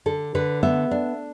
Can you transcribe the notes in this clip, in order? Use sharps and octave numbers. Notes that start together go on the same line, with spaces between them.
D3 A4
D3 B4
B3 E5
D4